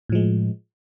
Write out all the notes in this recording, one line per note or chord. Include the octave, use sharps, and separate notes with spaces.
A2 F3 G#3